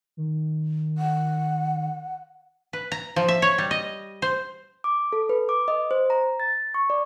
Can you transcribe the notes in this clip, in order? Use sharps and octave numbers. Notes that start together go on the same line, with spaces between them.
D#3
F#5
B4
A#5
F3
E5
C#5
G3
D#5
C5
D6
A4
B4
D6
D#5
C5
A#5
A6
C#6
D5